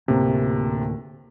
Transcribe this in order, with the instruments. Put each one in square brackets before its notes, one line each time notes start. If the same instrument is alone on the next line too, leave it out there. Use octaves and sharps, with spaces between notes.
[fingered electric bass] D2 A2 A#3 [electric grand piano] C3